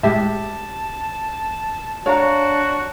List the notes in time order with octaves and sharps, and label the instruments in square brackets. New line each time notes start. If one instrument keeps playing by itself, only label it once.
[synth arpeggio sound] A2 G#3 [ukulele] G4 E5 [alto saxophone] A5
[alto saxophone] D4 [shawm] F#4 [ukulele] C#5 F5 A#5